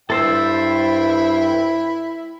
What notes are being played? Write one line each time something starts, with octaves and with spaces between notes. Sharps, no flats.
G2 E4 A4 C5 G5 E6